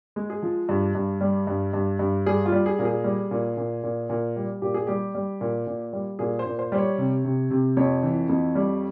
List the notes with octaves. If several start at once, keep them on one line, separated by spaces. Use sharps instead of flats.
G#3
G#4
F3
G2
G2
G3
G2
G2
G2
G3 G#4
F4
G3
G#4
A#2
G#4
G3
A#2
A#2
A#2
A#2
G3
A#2 G4
G#4
G3 G4
G3
A#2
A#2
G3
A#2 G#4
C5
A#2
C5
G3 C5
C#5
C3
C3
C3
F2 C#5
E3
F2
G3